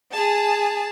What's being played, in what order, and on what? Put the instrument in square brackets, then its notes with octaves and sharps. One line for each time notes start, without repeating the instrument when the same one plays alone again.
[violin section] G#4 A5